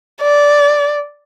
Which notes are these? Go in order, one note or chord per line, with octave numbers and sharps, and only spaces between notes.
D5